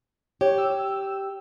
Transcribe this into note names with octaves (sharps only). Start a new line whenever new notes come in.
G4 C#5
E6